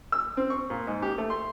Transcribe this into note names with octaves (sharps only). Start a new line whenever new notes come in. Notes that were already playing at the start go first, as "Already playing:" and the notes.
E6
C4
C#6
A#2
G#2
G4
A3
C6